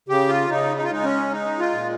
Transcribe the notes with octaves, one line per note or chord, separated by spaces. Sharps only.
C#3 G4
F4
C#3 D#4
D#4
F4
G#3 D#4
C#4
G#3 D#4
F4
A#2